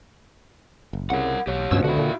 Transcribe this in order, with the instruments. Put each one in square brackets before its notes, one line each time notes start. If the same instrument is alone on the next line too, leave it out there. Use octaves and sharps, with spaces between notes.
[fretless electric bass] F#1
[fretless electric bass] C2 C#3 [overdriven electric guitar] A#4 F#5
[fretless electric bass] B1 [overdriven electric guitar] G4 C#5
[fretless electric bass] C#2 B2 F3 [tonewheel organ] G2 C#4 E6
[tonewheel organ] D3 [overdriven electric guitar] E4 F#4
[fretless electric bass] A#2